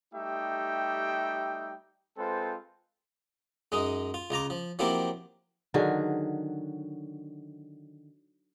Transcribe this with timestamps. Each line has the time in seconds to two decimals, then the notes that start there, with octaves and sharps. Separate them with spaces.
0.14 G3 A3 D#4 G4 E5 G5
2.18 G#3 C4 F4 A4 B4 C5
3.72 F#2 G#3 D#4
4.14 F4
4.30 C#2 F4 A#5 D6
4.50 F3
4.79 F3 F#3 A#3 C4 E4 G4
5.74 D3 D#3 F#3 G#4